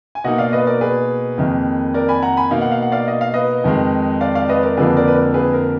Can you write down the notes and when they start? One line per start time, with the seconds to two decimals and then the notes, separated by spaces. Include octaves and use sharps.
0.15 G#5
0.24 B2 A#3 D#4 D#5 F#5
0.38 D5 F5
0.53 B4 D#5
0.66 A#4 D5
0.81 G#4 B4
1.38 F2 D#3 A#3
1.94 A#4 D5
2.09 G#5 B5
2.22 F#5 A#5
2.37 G#5 B5
2.51 B2 A#3 D#4 F5
2.61 F#5
2.72 F5
2.82 F#5
2.92 D5 F5
3.08 D#5
3.21 F5
3.34 B4 D#5
3.64 F2 D#3 G#3
4.21 D5 F5
4.35 D5 F5
4.49 B4 D#5
4.63 A#4 D5
4.77 F2 D3 F3 A#3 D4 G#4 B4
4.96 A#4 D5
5.07 B4
5.15 A#4
5.34 G#4 B4
5.53 A#4